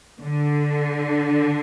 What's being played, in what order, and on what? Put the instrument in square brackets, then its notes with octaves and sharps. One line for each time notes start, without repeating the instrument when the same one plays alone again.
[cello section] D3